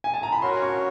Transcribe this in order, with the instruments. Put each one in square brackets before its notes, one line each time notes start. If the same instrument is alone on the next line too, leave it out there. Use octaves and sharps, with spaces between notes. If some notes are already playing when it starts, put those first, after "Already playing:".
[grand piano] G#5
A5
A#5
B5
[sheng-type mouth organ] C#4 F#4 A#4 C#5 [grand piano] C6
[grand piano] C#6